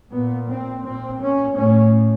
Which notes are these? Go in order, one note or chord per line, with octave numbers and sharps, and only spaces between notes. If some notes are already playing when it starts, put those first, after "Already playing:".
A#2 B3
C4
A#2 C4
C#4
A2 C#4